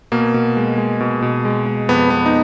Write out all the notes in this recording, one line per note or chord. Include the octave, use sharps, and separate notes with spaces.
B2 A#3
B2
G#3
G#3
B2
B2
G#3
G#3
F2 B3
G#3 B3
D#4